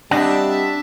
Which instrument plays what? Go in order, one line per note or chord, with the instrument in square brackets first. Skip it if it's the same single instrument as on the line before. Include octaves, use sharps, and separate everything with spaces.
[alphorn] G3 [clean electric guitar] C4 D#5 F#5 [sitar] D4 [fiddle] E5 A5